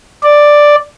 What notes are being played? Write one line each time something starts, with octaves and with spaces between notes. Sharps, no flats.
D5